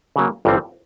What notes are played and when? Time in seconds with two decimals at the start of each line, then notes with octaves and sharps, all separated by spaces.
0.16 C#3 F#3 A#3
0.45 G1 G2 E3 G3 C4